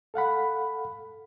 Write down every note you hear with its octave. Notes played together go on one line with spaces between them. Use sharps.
A4 F5 F#5 B5